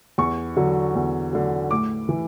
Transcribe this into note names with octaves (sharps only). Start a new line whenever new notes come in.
E2 C#6
D3 F#3
E2
D3 F#3
A2 D6
E3